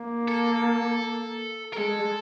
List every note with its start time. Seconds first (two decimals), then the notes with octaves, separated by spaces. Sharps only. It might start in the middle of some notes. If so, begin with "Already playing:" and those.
Already playing: A#3
0.28 A4
1.73 A#4
1.77 G#3 A4